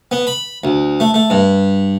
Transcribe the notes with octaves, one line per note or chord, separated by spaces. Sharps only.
B3
B5
D2
A3
A3
G2